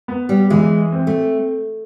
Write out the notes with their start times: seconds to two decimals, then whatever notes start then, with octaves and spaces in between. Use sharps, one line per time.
0.08 B3
0.29 G3
0.50 E3 G#3
0.92 C4
1.07 A3